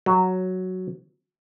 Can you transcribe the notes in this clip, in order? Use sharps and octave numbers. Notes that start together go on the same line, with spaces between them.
F#3